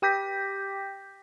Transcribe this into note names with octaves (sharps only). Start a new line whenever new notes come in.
G4 G5 D6 G6 A#6 B6